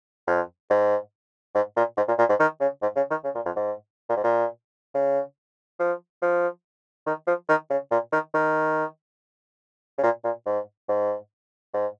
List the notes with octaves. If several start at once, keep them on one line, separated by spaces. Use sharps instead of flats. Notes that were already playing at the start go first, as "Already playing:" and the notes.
F2
G#2
G#2
A#2
G#2
A#2
A#2
G#2
D#3
C#3
G#2
C#3
D#3
C#3
A#2
F2
G#2
A#2
G#2
A#2
C#3
F3
F3
D#3
F3
D#3
C#3
A#2
D#3
D#3
C#3
A#2
A#2
G#2
G#2
G#2